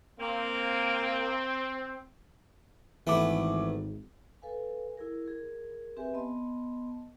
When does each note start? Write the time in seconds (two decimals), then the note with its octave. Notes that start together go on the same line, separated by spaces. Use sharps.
0.20 A#3 C4
3.07 G#1 E3 A3 B3 D6
4.42 A4 B4 F5 G#5
4.97 E4 G#4 A#4
5.26 G#4 A#4
5.97 C4 G4 B4 E5 G#5
6.14 B3 D#5 A5 C6